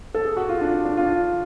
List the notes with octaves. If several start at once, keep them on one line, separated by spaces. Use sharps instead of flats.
A4
G#4
F#4
F4
D4
D4
F4